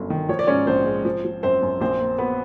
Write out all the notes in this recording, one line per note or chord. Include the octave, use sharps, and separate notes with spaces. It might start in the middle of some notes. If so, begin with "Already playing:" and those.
Already playing: G1 F#2
D#3
F3 C#5
D5
G#2 C#4 C#5
A#1 C4 C5
G#3
F3
F3
F#2 C4 C5
F#2
A#1 C4 C5
A#3
B3 B4